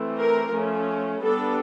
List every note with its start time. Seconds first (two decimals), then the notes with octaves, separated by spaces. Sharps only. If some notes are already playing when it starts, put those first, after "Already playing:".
Already playing: E3 A3 C4
0.18 A#4
0.53 F3 A3 C#4
1.21 G3 B3 D4 A4